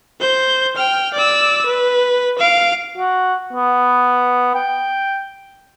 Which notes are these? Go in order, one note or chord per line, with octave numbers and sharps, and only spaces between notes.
C5 G6
G5 F6
D5 E6
B4
F5 D7
F#4
B3
G5